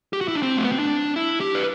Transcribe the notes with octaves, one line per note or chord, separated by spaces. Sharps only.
G4
F#4
E4
D4
C4
A3
B3
C4
D4
E4
G4
B4